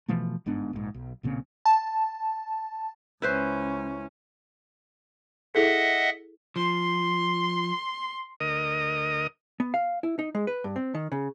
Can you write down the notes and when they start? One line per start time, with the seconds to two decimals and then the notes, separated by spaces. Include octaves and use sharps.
0.08 B2 E3 F3 A3
0.46 G1 G#2 B3 D4
0.73 A#1 G#2
0.94 B1
1.23 B1 A#2 C#3 C4
1.65 A5
3.22 C#2 C#4 E4 B4 C5
5.55 E4 G#4 A4 D#5 E5 F#5
6.56 F3 C6
8.40 D2 A#4 D#5 D#6
9.60 B3
9.74 F5
10.03 E4
10.19 D#4
10.35 G#3
10.47 B4
10.64 G2
10.76 C4
10.95 D#3
11.12 C#3